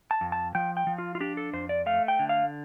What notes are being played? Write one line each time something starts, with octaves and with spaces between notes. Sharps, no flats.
A5
F2
A5
F3 G5
G5
F3
F4
F4
D4 G4
A4
F2 C5
D5
A3 F5
G5
D3
F5